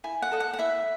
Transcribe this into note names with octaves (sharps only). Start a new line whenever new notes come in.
E4 G#5
F#5
A4 D#5
F#5
F#5
E4 E5